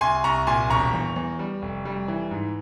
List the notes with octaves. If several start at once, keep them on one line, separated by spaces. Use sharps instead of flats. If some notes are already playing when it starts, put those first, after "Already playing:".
C2 G#5 C6
C2 A#5 C#6
A#2 G#5 C6
E1 A#5 C#6
E2
E2
G3
F1
G3
E3
G#2